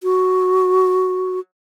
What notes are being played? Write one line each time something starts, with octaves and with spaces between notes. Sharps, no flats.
F#4